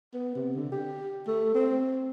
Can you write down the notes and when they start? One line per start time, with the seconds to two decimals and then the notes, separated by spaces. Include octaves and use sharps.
0.14 B3
0.35 C3
0.55 D3
0.72 G4
1.27 A3
1.54 C4